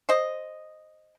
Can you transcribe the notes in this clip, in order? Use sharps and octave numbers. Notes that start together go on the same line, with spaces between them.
C5 D#5